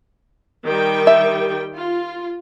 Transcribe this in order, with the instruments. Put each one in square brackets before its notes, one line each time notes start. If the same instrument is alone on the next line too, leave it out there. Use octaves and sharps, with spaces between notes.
[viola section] D#3 G3 G5
[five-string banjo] E5
[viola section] F4